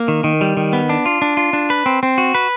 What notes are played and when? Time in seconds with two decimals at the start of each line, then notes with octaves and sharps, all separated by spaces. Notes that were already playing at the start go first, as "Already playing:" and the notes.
Already playing: A#3
0.08 D#3
0.24 D#3
0.41 G3
0.57 D#3
0.73 B3
0.89 D4
1.06 F4
1.22 D4
1.37 F4
1.53 D4
1.70 B4
1.86 C4
2.03 C4
2.18 F#4
2.35 B4